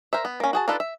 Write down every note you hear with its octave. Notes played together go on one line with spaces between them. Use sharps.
A#4 C5 E5
B3
A#3 C#4
F#4 G#4 A5
D4 D#4 F4 A4 B4
E5